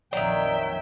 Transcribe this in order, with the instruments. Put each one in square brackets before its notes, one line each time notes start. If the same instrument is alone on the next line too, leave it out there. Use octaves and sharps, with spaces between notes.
[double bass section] A#1 F2 [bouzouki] D#3 F#3 [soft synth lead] D5 [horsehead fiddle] E5 G5